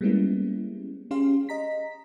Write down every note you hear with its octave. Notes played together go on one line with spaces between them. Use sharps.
G3 G#3 A#3 B3 C#4 E4
C#4 G4 G#4 F5 C6
D#5 A#5 B6